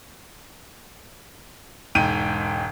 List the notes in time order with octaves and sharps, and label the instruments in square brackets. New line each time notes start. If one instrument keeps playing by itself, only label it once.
[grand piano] E1 G#2 G5 D#7